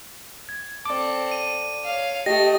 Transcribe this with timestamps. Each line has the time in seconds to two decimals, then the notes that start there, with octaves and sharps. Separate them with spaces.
0.49 G#6
0.86 C4 A4 D5 D6
1.32 D#7
1.85 C#5 F5
2.26 A3 G4 D#5 A#6